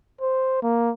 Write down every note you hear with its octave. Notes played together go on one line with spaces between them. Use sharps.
C5
A#3